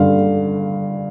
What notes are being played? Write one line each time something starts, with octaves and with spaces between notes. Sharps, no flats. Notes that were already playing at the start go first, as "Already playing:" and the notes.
Already playing: G2 D3 F5